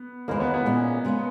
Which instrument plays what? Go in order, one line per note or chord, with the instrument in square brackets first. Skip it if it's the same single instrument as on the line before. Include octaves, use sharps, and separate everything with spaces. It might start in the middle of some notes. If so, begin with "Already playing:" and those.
Already playing: [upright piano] B3
[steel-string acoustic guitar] D#2 C#3 E3 G#3 [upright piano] A#3
[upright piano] B3
B3
[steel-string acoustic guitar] A#2 G#3 C#4
C#3 G#3 B3